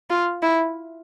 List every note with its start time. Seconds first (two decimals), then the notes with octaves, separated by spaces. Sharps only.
0.10 F4
0.43 E4